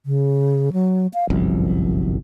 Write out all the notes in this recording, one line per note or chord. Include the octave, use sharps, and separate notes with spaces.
C#3
F#3
F5
G1 C2 F#2 F3